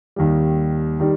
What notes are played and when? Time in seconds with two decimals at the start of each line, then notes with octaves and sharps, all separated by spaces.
0.16 D#2 D#3 G3
1.00 D#3 G3